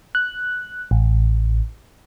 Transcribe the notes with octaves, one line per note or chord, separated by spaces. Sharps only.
F#6
A1